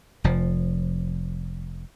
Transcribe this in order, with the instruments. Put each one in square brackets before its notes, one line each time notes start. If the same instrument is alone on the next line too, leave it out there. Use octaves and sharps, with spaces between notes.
[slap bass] F1 F3